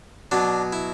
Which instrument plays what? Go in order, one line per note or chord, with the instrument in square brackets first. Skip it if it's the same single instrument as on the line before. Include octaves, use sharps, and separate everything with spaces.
[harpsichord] B2 F#3 D4
E4